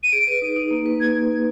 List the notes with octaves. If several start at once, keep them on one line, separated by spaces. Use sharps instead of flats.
D#7
G#4 D7
B4
D#4
D#4
A#3
B4
B4 G#6